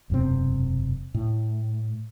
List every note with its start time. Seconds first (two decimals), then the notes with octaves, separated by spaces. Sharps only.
0.10 E1 F#2 C3 C4
1.14 A2